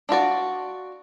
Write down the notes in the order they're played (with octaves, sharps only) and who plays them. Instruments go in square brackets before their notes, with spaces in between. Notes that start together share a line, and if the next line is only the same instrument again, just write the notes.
[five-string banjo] D4 F4 F#4 D5